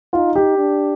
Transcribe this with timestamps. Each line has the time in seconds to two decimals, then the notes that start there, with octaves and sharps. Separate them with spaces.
0.13 D#4 F4
0.36 G4
0.58 D4